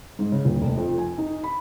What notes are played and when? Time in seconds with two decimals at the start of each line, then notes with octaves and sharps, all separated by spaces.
0.19 G#2
0.32 C#3
0.45 D#1
0.62 F1
0.77 F2
0.98 G#5
1.18 D#4
1.44 B5